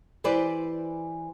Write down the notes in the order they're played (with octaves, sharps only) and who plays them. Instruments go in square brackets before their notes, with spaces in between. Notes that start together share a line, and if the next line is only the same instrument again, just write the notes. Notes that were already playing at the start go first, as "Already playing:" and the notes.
[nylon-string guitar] E3 G4 B4 C5 D5